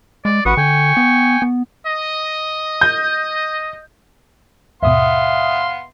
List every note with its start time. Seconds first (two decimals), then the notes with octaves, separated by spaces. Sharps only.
0.25 G#3 D5
0.45 A1 F#4 B4 C#6 D#6
0.57 D3 G5 G#5
0.97 B3
1.42 B3
1.86 D#5
2.81 G6
4.83 D#2 G#2 B2 B3 E5 F5 C6 D#6